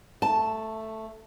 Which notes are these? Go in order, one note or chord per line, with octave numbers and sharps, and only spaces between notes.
A3 A5